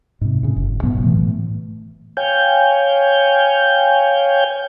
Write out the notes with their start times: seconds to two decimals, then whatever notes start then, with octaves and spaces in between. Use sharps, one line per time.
0.21 G#2 C3
0.43 A2 C#3
0.56 F#1
0.83 G#2 B2 F#3 B3
1.04 A2 E3 A3
2.17 C#5 F5 G5 G#5 G6